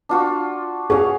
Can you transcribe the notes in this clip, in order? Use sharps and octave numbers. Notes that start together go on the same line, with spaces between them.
D4 F4 F#4
C#4 F#4 G#4 F5